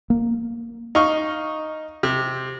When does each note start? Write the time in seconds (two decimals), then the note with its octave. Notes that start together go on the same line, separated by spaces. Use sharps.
0.10 A#3
0.95 D#4 F5 C#6
2.03 C3